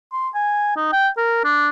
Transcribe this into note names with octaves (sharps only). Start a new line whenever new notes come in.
C6
G#5
D#4
G5
A#4
D4